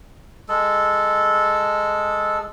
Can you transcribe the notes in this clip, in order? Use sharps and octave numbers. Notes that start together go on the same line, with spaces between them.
G#3 A4